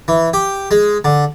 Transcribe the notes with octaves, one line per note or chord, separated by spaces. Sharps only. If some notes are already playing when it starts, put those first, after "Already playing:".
E3
G4
G#3
D3